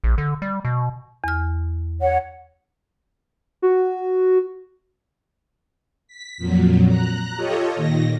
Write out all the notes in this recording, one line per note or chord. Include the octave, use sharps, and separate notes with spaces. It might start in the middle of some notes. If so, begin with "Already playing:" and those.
A#1
D3
G3
B2
E2 F6
C#5 F#5
F#4
B6
F2 A#2 F#3
A#5 F#6
F4 G4 A4 C#5 D#5
A#2 D#3 A#6